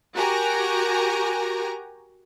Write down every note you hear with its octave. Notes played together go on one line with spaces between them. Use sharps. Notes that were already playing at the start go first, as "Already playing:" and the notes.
F#4 G4 A#4 G#5 A#5